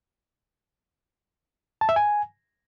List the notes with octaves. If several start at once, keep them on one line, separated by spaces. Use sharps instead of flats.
A5
E5
G#5